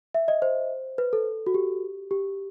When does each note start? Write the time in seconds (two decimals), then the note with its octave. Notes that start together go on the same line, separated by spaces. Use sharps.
0.14 E5
0.28 D#5
0.42 C5
0.98 B4
1.13 A4
1.47 F#4
1.54 G4
2.11 G4